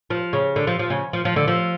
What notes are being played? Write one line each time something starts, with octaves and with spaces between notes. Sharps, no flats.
F3
C#3
D3
F3
F3
C#3
F3
F3
D3
F3